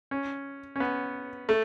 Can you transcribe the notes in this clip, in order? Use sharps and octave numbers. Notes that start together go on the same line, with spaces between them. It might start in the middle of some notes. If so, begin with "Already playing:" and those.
C#4
C#4
B3
A3